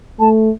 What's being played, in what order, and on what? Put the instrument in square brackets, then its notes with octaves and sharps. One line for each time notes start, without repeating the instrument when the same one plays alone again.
[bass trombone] A3 [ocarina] A5